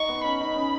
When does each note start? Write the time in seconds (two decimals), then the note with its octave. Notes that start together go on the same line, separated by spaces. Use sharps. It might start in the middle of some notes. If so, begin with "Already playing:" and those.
Already playing: D#4 C#6
0.09 B3
0.24 C#4 B5
0.40 D#4
0.56 C#4